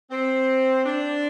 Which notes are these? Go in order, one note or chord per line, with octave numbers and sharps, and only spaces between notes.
C4
D4